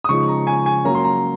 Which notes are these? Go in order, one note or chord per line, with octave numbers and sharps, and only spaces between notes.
D#6
C#3 F3 G#3 D#4 C#6
A#5
G#5
G#5
F#3 A#3 C#4 A#5
C6
A#5